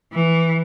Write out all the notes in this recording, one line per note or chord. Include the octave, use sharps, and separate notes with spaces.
E3